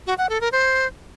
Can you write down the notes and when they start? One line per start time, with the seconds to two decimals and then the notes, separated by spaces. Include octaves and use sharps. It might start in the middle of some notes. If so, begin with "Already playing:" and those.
0.07 F#4
0.18 F#5
0.29 A4
0.41 A#4
0.52 C5